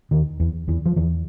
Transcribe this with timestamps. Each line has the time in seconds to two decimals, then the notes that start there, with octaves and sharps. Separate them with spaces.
0.11 D#2 D#3
0.40 E2 E3
0.68 E2 E3
0.86 F3
0.96 E2 E3